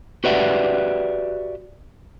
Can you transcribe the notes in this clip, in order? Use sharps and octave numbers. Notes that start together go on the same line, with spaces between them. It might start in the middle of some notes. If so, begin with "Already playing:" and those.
F#4 G4 B4 D5 E5 F#5